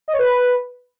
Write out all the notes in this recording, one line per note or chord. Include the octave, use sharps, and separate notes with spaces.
D#5
C#5
B4